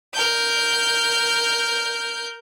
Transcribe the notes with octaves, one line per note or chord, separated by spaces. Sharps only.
A#4 G6